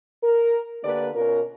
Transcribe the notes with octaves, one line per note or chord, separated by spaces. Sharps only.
A#4
D3 A#3 D4 G4 B4 D5
B2 C#4 F4 A#4